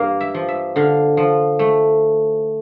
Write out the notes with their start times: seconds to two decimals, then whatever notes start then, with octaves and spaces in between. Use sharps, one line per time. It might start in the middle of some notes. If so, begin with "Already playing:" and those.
Already playing: G2 A#3 F5
0.21 E5
0.34 F3
0.48 E5
0.76 D3 F5
1.17 F3
1.59 A3